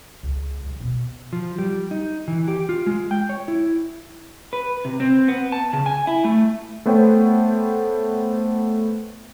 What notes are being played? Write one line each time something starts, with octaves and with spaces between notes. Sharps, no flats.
C#2
C2
B2
F3
G3
D#4
E3
G4
F4
G#3
G5
C#5
E4
B4
C3
C4
B3
A5
C#3
G#5
E4
A3
A3 B3 C5 C#5 G5